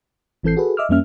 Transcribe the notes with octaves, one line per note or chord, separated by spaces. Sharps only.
A1 E3 C4 A4 G6 C7
F#4 G#4 A4 B4
D#5 E5 D6 E6 F6
F2 G3 A#3 C#4 E5 F6